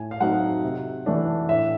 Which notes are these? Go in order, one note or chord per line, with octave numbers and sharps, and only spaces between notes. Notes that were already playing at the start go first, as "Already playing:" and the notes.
Already playing: A2 G#5
F5
F#3 A3 C4 D#4 F#5
C3
E3 A3 D4
A2 E5